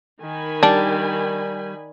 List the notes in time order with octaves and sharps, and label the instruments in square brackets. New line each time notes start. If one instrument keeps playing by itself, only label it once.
[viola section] D#3 G#5 B5
[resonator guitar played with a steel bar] G3 [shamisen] D4